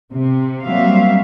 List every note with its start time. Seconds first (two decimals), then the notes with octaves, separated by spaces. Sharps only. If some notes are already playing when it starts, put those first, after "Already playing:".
0.11 C3
0.65 F#3 G3 A#3 C4 E5 F5